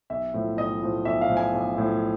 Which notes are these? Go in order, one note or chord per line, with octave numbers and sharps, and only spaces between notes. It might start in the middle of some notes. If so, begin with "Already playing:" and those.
B1 E5
A2 F3
B1 D#5
A2 F3
B1 E5
F5
A2 F3
G#5
B1
A2 F3